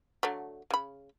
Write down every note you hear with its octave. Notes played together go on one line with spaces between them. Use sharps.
D3 F#3 A3
C#3 B5